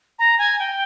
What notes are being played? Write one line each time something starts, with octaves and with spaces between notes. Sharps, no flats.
A#5
G#5
G5